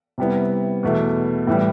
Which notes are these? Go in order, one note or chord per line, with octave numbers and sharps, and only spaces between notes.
C3 G3 B3 E4
E2 B2 A3 E4
A2 E3 G3